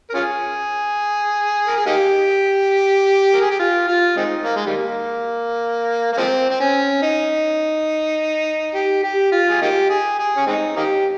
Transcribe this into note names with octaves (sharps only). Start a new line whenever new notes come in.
A#4
C#4 F4 G#4
A#4
G#4
A#3 D#4 G4
A#4
G#4
G4
F4
F4
G#3 C4 D#4
A#3
G#3
D#3 G3 A#3
A#3
F3 G#3 C4
C4
C#4
D#4
G4
G4
F4
G#4
A#3 D#4 G4
G#4
G#4
C#4
G#3 C4 D#4
A#3 D#4 G4